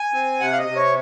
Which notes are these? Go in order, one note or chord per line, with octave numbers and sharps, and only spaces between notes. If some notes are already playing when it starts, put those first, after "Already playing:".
Already playing: G#5
C4
C3 F#5
F5
D#5
C3
C#5